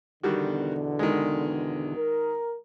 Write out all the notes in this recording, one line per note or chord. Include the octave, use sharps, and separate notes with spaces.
E2 B2 D3 D#3 G3 F#4
D#3 G#3
A#4